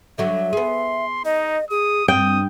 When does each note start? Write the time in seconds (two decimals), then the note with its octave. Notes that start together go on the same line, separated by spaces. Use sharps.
0.18 D3 F#3 F#4 E5
0.53 B3 G#4 C6
1.25 D#4 D#5
1.70 G#4 D#6
2.08 G2 C4 G5 D#6